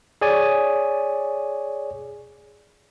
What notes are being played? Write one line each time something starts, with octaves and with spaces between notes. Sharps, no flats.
G#4 C#5 D5 G#5